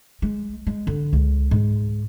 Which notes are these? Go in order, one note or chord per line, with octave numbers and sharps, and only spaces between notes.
G#3
G#3
D3
C#2
G#2